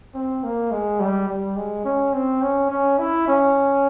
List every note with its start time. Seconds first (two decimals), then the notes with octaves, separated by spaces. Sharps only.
0.14 C4
0.43 A#3
0.71 G#3
1.00 G3
1.28 G3
1.56 G#3
1.85 C#4
2.13 C4
2.42 C#4
2.70 C#4
2.99 E4
3.28 C#4